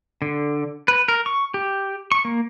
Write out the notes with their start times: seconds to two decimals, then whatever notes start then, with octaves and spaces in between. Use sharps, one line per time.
0.22 D3
0.88 B4
1.08 A#4
1.26 C#6
1.54 G4
2.12 C#6
2.25 A#3